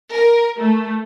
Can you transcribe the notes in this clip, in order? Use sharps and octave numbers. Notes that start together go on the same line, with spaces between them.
A#4
A3